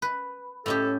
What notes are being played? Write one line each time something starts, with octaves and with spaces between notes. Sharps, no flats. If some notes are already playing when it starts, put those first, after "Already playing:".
B4
A2 C#4 G4 A4